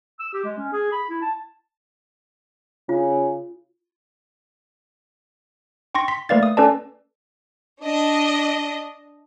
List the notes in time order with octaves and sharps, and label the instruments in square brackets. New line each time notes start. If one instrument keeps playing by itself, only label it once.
[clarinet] E6
G4
G#3
C#4
G#4
B5
E4
A5
[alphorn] C#3 [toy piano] F4
[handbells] G5 C6 C#6 A#6
C6 B6
A3 A#3 B4 D5 F5 A6
D#6
C#4 A4 B4 D5 A5
[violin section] D4 D#5